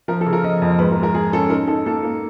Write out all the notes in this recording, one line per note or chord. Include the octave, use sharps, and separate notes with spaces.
F3 A#4
A4
C#3
A#4
F3 D#5
F2
G#2 B4
A#4
G#3
A#4
G#3 G#4
C#4 A4
D#4 A#4
D#4 A4
A#3 A4
A#3